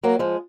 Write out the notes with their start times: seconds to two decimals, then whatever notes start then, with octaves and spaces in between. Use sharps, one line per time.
0.03 F#3 A#3
0.19 F3 G#3